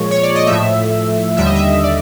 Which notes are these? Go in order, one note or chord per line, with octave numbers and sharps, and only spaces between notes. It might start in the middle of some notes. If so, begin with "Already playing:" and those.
Already playing: A#2 F3 G#3 C#5
C#5
D5
D#5
A2 F3 A3 E5
D#2 D3 G3 E5
D#5
E5
D5